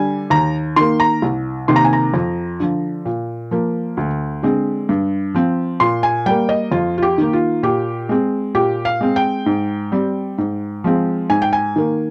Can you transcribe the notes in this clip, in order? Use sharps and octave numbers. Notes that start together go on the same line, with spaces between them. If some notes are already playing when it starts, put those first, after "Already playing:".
Already playing: D3 G3 G#5
D#2 A#5
D#3 A#3 C6
A#5
C2
C3 D#3 A#3 C6
A#5
G#5
A#5
F2
D3 F3
A#2
F3 A#3
D2
D3 G#3 C4
G2
F3 C4
A#2 C6
G#5
G3 A#3 G5
D#5
F2 F4
F4
G4
D#3 A#3
F4
A#2 G4
G#3 C4
A#2 G4
F5
G#3 C4
G5
G#2
G3 C4
G#2
F3 G#3 C4
G#2 G#5
G5
G#5
D#3 A#3